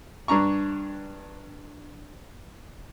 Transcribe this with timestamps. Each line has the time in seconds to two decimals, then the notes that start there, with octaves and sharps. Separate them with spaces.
0.28 G2 D4 A#5 C#6